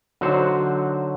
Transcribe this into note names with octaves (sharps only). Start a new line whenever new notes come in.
D3 F#3 D#4 F#4 C5 F#5